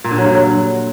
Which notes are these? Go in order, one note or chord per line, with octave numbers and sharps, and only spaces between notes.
A#2
D3
F#3
G2
F#3